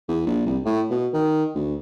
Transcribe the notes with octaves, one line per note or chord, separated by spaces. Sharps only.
E2
A#1
C2
A2
B2
D#3
D2